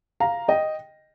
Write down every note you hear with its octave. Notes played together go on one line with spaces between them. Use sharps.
F5 A#5
D#5 G5